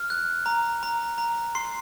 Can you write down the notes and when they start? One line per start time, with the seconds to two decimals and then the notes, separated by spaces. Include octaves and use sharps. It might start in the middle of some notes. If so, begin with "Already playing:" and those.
Already playing: F6
0.10 F#6
0.46 A#5
0.83 A#5
1.18 A#5
1.55 C6 C7